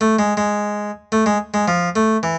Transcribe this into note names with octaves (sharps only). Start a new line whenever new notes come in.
A3
G#3
G#3
A3
G#3
G#3
F3
A3
E3